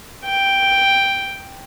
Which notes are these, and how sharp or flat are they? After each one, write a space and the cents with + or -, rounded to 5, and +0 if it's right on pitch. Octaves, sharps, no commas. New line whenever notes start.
G5 +0